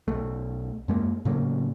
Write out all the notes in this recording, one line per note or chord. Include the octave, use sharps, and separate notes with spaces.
B1 A3
F#2 G#3 A#3
A2 C#3 F#3 A#3